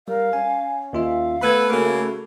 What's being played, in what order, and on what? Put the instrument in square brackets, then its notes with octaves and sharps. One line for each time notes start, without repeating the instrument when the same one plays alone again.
[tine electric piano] G3 [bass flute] A#4 [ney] F5
[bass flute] C#4 [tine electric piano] G#5
[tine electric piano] D#2 F4 E5 [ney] F5
[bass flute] A3 [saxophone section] B3 A4 B4 [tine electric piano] B5 G#6
[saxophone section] C#3 A#3 [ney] F#4